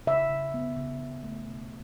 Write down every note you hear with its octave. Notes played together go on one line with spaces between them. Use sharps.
C#3 E5
C#3
B3
C#3
C#3
A3
B2